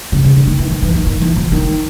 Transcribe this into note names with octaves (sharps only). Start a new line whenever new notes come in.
C#3
C#3
D3
D#3
E3
D#3
E3
D#3
D#3
E3
F3
D#3